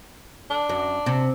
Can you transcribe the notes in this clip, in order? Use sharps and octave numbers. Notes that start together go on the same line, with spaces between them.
D4
F#2
C3